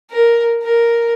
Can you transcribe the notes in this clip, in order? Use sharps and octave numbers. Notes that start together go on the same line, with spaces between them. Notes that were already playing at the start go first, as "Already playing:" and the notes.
A#4
A#4